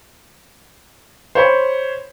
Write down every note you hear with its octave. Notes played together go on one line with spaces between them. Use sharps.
C5 C#5 B5